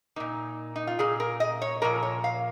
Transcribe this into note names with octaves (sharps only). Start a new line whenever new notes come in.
A#2 A#3 D#4
D#4
F4
A#2 A#3 G#4
A#4
D#5
C#5
A#2 F3 A#3 A#4
C#5
F5